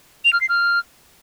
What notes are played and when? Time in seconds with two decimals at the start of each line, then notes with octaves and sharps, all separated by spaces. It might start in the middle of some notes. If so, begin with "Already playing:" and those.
0.25 F7
0.33 F6
0.41 C7
0.49 F6